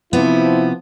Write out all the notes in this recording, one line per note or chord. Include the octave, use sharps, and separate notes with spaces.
C3 F3 B3 E4